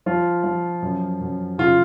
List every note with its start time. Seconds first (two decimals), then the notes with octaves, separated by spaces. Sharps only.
0.06 F3 F4
0.44 F3
0.82 F#2
1.21 F#2
1.58 C#3 F4